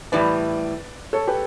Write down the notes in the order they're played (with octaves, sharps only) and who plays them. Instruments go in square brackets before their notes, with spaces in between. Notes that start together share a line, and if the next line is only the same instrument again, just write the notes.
[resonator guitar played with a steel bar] A2 E3 G3 [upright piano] B4 D5
[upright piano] A4 C#5
G4 B4